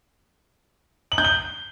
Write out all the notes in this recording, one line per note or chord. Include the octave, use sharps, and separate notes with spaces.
F#7
G6
G7